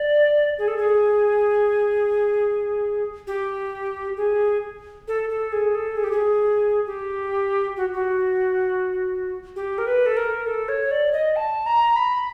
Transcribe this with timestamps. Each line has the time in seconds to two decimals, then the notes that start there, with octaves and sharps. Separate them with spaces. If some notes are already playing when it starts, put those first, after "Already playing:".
Already playing: D5
0.58 G#4
0.68 A4
0.77 G#4
3.27 G4
4.17 G#4
5.07 A4
5.29 A4
5.52 G#4
5.75 A4
5.97 G#4
6.04 G4
6.12 G#4
6.86 G4
7.77 F#4
7.93 F#4
9.56 G4
9.78 A#4
9.86 B4
10.06 A4
10.17 A#4
10.46 A4
10.68 C#5
10.91 D5
11.13 D#5
11.36 A5
11.66 A#5
11.96 B5